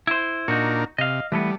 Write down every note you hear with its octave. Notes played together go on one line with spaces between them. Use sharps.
E4 C5
A#2 D4 D#4 F#4 A#4
C3 D#5 F5
E3 G3 A3 B3